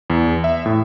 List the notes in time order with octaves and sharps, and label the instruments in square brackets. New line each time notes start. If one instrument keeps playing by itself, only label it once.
[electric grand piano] E2
E5
A2